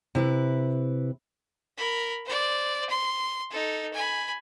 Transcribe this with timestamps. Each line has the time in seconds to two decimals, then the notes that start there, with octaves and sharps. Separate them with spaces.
0.15 C3 E4 B4
1.77 A#4 B5
2.25 C5 D5
2.90 C6
3.50 D#4 A4
3.94 G#5 B5